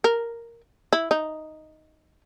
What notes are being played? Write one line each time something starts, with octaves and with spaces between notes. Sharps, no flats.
A#4
E4
D#4